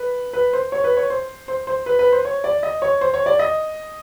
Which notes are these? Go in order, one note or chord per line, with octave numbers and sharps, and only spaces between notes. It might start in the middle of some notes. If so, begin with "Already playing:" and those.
Already playing: B4
B4
C5
C#5
B4
C#5
C5
C5
C5
B4
B4
C5
C#5
D5
D#5
C#5
C5
C#5
D5
D#5